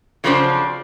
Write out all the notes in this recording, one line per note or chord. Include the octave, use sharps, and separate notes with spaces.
C#3 F3 F#3 C4 D4 C5